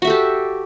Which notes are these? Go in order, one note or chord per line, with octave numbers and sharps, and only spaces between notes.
F#4 G4 A4 E5